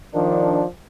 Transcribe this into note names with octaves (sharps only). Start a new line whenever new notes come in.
D#3 F3 D4